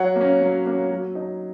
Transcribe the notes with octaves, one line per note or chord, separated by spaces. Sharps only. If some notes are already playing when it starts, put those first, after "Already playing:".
Already playing: F#3 C#5 F#5
A#3
C#4
F#3
A#3 C#4
F#3
D#4